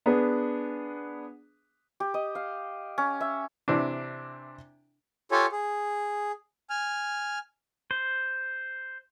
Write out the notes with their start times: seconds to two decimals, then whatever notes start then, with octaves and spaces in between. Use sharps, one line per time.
0.06 B3 D4 G#4 B4
2.00 G4
2.14 D#5
2.35 F5
2.98 C#4
3.21 E5
3.68 C3 E3 C4 D4
5.31 F4 G4 A4 C#5 G#5
5.52 G#4
6.70 G#5 F6
7.91 C5